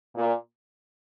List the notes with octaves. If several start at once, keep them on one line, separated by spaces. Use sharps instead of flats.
A#2